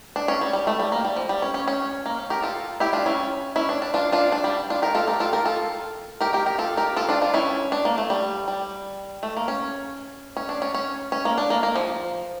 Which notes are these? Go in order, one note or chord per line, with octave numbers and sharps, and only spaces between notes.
D4
C#4
G3
G3
A3
G3
A#3
G3
F3
G3
C#4
C#4
C#4
A#3
C#4
G4 A#4
F4 A4
E4 G4
D4 F4
C#4 E4
C#4 E4
D4
D4
D4 F4
D4 F4
D4
G3
D4 F4
G4 A#4
F4 A4
G4 A#4
F4 A4
G4 A#4
F4 A4
G4 A#4
G4 A#4
G4 A#4
F4 A4
G4 A#4
F4 A4
D4 F4
D4 F4
C#4 E4
D4
A#3
A3
G3
G3
A3
A#3
C#4
C#4
D4
C#4
C#4
C#4
A#3
D4
A#3
A#3
F3